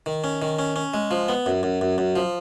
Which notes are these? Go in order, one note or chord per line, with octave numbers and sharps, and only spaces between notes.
D#3
C#4
D#3
C#4
C#4
G#3
F3
B3
F#2
F#2
F#2
F#2
F3